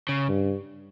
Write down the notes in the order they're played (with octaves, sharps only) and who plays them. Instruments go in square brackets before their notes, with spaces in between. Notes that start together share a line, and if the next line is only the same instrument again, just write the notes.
[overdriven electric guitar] C#3
[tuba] G2